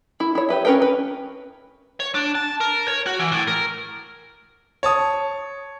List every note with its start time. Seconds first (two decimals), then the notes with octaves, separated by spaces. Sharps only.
0.20 E4
0.35 E4 C#5
0.49 G4 B4 E5
0.65 C#4 E4 A#4 B4 G5
0.82 B4
2.00 C#5
2.15 D4
2.35 A5
2.61 A#4
2.88 C#5
3.07 F#4
3.19 E3
3.32 A2
3.48 A#4
4.83 C#5 A5 D#6